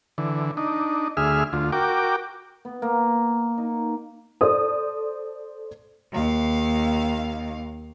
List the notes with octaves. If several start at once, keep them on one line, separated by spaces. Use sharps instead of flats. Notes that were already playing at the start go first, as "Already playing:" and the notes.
D3 E3
D4 D#4
D2 G#4 E5 F6
D2 F4
F#4 A#4 G5 D6
B3
A#3
D#4
A4 C5 D5 D#6
D#2 F5